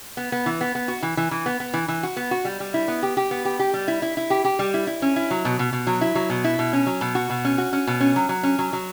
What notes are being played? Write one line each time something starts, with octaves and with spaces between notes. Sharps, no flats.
B3
B3
E3
B3
B3
F#4
E3
E3
E3
B3
B3
E3
E3
F#4
B3
F#4
G3
G3
E4
B3
G4
G4
B3
G4
G4
G3
E4
E4
E4
G4
G4
G3
E4
E4
C#4
E4
F#3
B2
B2
B2
F#3
E4
F#3
B2
E4
B2
C#4
F#3
B2
F#4
B2
C#4
F#4
C#4
B2
C#4
F#3
F#3
C#4
F#3
F#3